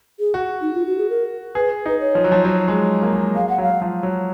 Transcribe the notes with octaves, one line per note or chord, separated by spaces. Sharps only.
G#4
F#4
D#4
F4
F#4
G#4
A#4
G#4 B4
D#4 B4
C#5
F3
F#3
F3
F#3
G#3
A#3
G#3
G#3 F5
F#5
F#3
F5
F#3
F3
F#3